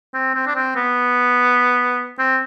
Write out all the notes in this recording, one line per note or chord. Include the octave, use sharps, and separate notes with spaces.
C4
C4
D4
C4
B3
C4